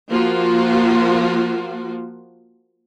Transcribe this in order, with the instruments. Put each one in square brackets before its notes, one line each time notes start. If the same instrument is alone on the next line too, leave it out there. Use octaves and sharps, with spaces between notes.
[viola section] F3 A#3 F4 F#4